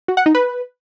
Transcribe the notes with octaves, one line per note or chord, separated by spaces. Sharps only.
F#4
F#5
D#4
B4